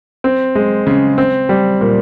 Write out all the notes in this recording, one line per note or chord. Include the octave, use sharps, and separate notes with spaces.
C4
G#3
C#3
C4
G3
A#2